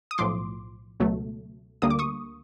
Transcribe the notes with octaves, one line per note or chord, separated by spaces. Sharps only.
D#6
B1 A2 F3 C6 D6
C#2 B2 F#3 A3
D2 D3 G3 A#3 D#6
D6
C#6 D#6